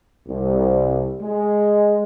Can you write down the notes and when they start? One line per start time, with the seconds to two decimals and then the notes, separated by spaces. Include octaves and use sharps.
0.28 C2
1.22 G#3